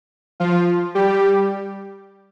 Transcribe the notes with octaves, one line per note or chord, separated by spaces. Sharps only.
F3 F4
G3 G4